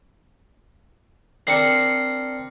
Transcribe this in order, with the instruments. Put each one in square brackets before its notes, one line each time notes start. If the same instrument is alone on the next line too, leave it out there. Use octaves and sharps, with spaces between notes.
[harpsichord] C4 D4 A#4 [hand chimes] C7 C#7